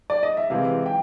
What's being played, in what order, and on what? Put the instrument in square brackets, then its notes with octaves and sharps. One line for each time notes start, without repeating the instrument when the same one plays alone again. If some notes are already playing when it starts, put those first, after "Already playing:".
[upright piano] D5
D#5
E5
[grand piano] C3 E3 G#3 [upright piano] F5
[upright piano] G5